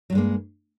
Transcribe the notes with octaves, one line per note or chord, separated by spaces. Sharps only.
G2 F#3 G#3 A#3